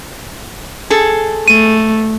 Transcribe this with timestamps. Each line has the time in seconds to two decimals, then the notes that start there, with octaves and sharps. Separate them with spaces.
0.90 G#4 A4
1.48 A3 D#7